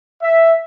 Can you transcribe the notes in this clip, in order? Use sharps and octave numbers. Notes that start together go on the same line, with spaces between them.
E5